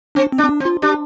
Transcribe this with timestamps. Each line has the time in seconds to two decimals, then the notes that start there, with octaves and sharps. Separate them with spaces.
0.15 C4 D4
0.32 C4
0.38 D4
0.44 C4
0.49 D4
0.60 C4
0.65 F4
0.82 D4 G4